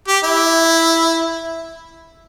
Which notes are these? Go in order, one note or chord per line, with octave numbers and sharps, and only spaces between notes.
G4
E4